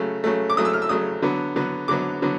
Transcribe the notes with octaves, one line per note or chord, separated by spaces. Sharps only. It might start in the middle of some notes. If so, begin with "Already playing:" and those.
Already playing: C#3 F#3 A3
C#3 F#3 A3
D6
C#3 F#3 A3 D#6
E6
F6
E6
C#3 F#3 A3 D#6
D3 F#3 B3
D3 F#3 B3
D3 F#3 B3 D6
D3 F#3 B3